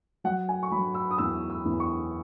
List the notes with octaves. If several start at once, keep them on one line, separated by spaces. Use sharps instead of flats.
F#3 F#5
G#5
C#6
F#3 B5
E6
D#6
E2 E6
E6
E2
C#6